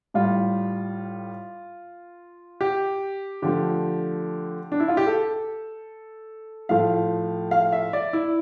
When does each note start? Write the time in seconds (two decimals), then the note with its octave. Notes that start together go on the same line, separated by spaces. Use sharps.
0.14 A2 G3 F4
2.61 G4
3.42 D3 F3 A3 G4
4.72 D4
4.80 E4
4.88 F4
4.97 G4
5.07 A4
6.69 A2 F3 A3 F5
7.51 F5
7.72 E5
7.93 D5
8.13 E4